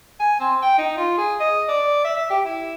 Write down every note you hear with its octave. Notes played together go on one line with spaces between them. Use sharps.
G#5
C4
G5
D#4
F4
G#4
D#5
D5
E5
E5
G4
E4